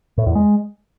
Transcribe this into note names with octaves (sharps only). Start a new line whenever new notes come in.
A2
E2
G#3